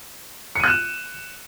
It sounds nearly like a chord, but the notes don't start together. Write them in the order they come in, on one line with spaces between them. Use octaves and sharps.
C#7 D#7 F#6 E7